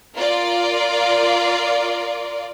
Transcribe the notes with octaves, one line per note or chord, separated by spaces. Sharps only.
F4 A#4 D5